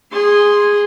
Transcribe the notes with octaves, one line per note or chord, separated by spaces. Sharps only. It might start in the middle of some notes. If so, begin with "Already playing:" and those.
G#4 C6